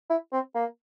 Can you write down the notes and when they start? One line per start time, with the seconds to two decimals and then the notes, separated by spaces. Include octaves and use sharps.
0.10 E4
0.33 C4
0.55 A#3